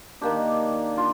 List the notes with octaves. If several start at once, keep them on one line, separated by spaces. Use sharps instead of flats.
D#3 A#3 D4 G4
D4 F4